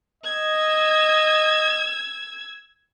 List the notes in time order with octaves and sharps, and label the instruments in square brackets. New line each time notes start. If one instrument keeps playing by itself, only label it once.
[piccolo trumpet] D#5 [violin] E6 G#6